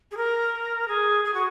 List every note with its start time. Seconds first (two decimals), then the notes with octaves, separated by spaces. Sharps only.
0.11 G#4
0.17 A#4
0.88 G#4
1.25 G#4
1.34 F#4